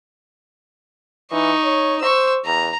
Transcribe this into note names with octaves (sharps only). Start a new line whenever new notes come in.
E3 D#4 C#6
C#5
C5 C#6 E6
E2 A#5